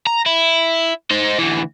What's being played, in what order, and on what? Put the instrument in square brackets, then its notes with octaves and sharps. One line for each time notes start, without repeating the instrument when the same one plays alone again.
[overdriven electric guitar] A#5
E4
D#4 C5
D2 E3